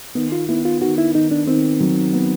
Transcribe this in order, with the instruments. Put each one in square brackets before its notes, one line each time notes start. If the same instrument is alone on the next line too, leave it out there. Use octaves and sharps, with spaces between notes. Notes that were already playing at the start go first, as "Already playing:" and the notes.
[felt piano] D#3 [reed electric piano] B3
[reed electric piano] F4
[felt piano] B3 [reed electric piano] E4
[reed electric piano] F4
[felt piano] D#3 [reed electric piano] F#4
[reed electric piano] E4
[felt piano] D#3 [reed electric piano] D#4
[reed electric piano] D4
[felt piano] D#3 [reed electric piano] C4
[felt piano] F#3
B3